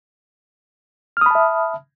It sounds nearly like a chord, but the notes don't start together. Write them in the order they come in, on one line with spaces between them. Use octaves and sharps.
F6 D#6 B5 A5 E5